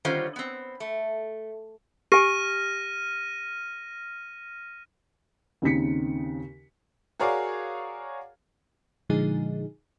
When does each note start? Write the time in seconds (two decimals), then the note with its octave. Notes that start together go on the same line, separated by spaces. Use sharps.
0.05 D3 D#3 G3 C#4 F4 C5
0.36 B3 C4
0.80 A3
2.12 G4 G#5 F6 A#6 D#7
5.62 D#2 C#3 C4 D#4 B6 C#7
7.20 F#4 G#4 A#4 C#5 D5 F5
9.10 A#2 D3 F3 G#3 D#4 G#4